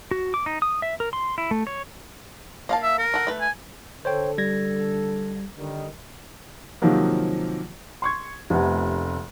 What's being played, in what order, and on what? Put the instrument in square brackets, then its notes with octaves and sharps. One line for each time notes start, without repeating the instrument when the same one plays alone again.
[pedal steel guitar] F#4
D6
D#4
D#6
E5
A#4
C6
E4
A3
C#5
[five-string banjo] A#3 F5 A5
[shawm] E5
A#4
[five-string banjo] A4 F#5
A3 B4
[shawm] G#5
[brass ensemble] D3 A4 [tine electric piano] C5 C#5 G5
[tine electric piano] G3 G#6 A#6
[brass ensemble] D3 D#3 G3
[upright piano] C3 D#3 F3 F#3 A#3
C6 C#6 G#6
F1 C3 A3 B3 F#5